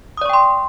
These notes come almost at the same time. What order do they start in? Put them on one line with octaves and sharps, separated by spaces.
D#6 D5 C#6 G5 C6